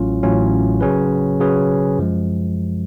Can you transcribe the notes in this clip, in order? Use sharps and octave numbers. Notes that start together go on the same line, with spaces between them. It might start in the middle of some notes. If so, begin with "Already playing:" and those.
Already playing: A1 A2 F#3 C#4 F4
A1 A2 F#3 C#4 F4
C#3 F#3 C#4 G#4 B4
C#3 F#3 C#4 G#4 B4
F#2 F3 G#3